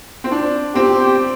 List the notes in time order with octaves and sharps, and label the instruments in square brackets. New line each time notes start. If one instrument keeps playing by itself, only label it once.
[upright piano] C4
D4
[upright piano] C4 [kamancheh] G4